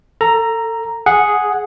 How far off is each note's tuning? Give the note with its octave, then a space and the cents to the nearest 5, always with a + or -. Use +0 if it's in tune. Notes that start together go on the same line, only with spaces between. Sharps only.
A4 +25 A#5 +0
G#4 +0 F#5 -10